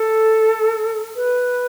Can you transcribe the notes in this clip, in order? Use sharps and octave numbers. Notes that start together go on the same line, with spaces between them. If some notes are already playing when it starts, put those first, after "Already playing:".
Already playing: A4
B4